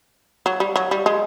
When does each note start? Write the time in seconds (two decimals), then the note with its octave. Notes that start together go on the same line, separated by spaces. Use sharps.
0.46 F#3
0.60 G3
0.76 F#3
0.91 G3
1.06 G#3